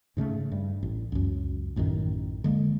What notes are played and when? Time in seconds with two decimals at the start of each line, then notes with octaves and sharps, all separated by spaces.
0.17 G#2 C#3 G#3 A3
0.52 G2
0.83 A1
1.12 C#2 F#2
1.76 A1 F#2 A2 D#3
2.44 D3 G#3 A#3